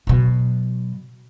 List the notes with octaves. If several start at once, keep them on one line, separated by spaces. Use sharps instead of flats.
B2 F#3